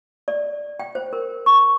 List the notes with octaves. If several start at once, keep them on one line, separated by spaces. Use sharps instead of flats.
D5
G5
C5
A#4
C#6